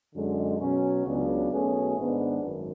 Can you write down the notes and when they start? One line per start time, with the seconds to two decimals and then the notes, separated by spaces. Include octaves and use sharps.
0.14 F#2 D3 G#3
0.59 B2 F#3 C#4
1.05 C#2 C#3 F#3 B3 D4
1.50 B1 B2 A3 C#4 G#4
1.96 G#1 G#2 G#3 B3 D4
2.42 G#1 F#2